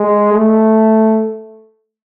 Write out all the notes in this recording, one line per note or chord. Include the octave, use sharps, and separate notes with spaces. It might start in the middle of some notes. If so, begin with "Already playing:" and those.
Already playing: G#3
A3